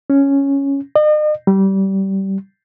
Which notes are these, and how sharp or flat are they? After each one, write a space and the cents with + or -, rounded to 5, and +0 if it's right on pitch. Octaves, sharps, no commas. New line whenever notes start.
C#4 +0
D#5 -40
G3 -20